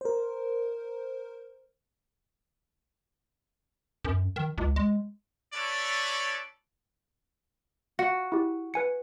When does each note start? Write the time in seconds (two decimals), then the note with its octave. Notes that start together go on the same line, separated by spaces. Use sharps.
0.01 A#4 C5
4.05 F#2
4.36 D#3
4.58 C#2
4.76 G#3
5.54 C#4 E4 A4 B4 C#5 D5
7.99 F#4
8.32 E4 G4
8.74 B4 G#5 C#7